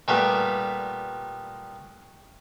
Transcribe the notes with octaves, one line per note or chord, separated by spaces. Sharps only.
A#2 G3 A3 B3